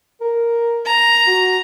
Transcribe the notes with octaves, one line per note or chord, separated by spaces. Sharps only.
A#4
A#5
F#4